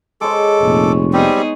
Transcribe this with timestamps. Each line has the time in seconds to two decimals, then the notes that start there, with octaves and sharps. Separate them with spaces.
0.21 G#3 A4 C#5 D6
0.61 F1 A#2
1.13 G3 B3 C4 D#4 G4 G#4